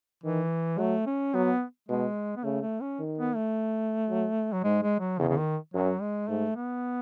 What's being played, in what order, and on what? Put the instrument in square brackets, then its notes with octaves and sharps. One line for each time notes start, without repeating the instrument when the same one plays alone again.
[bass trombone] D#3 [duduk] E3
[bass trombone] F#3 [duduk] A3
[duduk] C#4
[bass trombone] F#3 [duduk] B3
[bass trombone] B2 [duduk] G#3
[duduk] B3
[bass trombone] C#3 [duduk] A3
[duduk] A3
C#4
[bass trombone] D#3
[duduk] B3
A3
[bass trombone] F#3
[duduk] F#3
[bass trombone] G#2 [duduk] G#3
[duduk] G#3
F#3
[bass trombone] E2 [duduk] C#3
[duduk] C#3
D#3
[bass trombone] F#2 [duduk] F#3
[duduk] G#3
[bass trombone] G#2 [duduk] A3
[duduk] B3